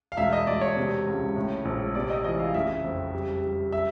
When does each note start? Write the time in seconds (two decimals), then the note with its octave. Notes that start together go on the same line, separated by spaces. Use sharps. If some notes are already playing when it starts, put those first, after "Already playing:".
0.12 F5
0.17 E1 E5
0.33 D#5
0.47 E1 D5
0.61 C#5
0.77 C3
1.06 C#2
1.36 A2
1.65 A#1
1.95 C3 D5
2.10 D#5
2.24 E3 D#5
2.39 F5
2.54 F#1 E5
2.84 F2
3.14 G3
3.43 G3
3.72 E5